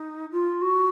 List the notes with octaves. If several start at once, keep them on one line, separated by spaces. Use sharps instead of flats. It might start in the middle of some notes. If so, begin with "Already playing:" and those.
Already playing: D#4
F4
F#4